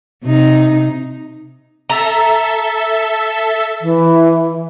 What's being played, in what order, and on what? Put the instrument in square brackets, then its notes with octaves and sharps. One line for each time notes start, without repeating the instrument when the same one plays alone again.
[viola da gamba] C3 D#4
[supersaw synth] A4 E5 [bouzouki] A#5
[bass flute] E3